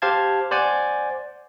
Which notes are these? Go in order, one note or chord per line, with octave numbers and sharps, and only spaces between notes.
G4 C5 F5 A5 G#6
C5 D5 F#5 G#5